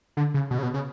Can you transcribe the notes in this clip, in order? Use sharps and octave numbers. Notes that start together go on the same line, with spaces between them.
D3
C#3
B2
C#3
B2
C#3